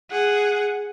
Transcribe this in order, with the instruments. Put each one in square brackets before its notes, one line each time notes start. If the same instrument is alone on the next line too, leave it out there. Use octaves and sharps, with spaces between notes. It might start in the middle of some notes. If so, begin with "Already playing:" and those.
[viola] G#4 F#5